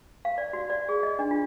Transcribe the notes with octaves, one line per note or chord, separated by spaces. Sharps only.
F5
D5
F#4
D5
G#4
D#5
D4
F4